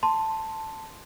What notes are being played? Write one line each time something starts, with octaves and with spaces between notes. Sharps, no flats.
A5 C6